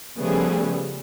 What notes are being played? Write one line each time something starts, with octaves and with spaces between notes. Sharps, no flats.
C#3 F3 G3 A3 B3 G#4